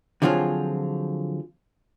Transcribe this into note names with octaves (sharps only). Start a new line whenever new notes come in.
D3 F3 F#3 C4 F4 G#4